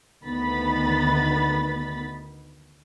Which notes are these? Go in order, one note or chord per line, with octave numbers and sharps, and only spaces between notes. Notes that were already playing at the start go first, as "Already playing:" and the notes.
D2 D#3 B3 B5 A6